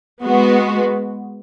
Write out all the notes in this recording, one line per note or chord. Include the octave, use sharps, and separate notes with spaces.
G#3 B3 F#4